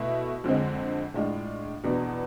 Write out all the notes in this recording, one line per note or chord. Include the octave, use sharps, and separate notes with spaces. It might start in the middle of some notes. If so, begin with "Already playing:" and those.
Already playing: B2 A3 E4
F2 D3 G#3 C4
A2 G#3 D4 F4
E2 B2 B3 D4